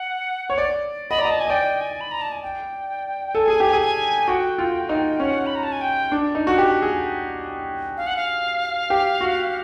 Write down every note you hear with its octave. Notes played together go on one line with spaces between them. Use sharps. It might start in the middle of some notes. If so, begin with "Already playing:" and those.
Already playing: F#5
C#5
D5
D#5 B5
D5
D#5 A#5
A5
G#5
D#5
D5 G5
G#5
B5
A#5
A5
G#5
G5
A4 G#5
G#4
G4
G#4
G#5
F#4 G5
F4
D#4
C#4 F#5
B5
A#5
A5
G#5
G5
D4
D#4
F#4
G4
G#4
F5
F#5
F5
G4
F#4